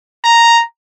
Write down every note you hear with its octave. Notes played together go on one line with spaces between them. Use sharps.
A#5